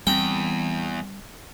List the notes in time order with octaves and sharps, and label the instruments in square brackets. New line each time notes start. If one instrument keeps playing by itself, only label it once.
[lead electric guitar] E2 [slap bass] G3 B3 C4 [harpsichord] G5